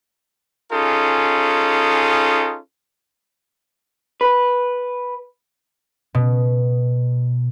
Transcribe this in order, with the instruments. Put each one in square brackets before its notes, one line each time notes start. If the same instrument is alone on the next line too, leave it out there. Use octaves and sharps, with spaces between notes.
[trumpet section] C#4 D#4 F4 G#4 A4
[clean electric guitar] B4
[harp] B2